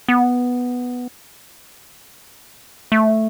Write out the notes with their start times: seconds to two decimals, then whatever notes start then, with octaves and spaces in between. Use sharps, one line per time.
0.08 B3
2.92 A3